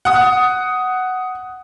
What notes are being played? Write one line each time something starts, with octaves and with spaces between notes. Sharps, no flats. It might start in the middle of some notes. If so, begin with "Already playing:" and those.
F#5 D#6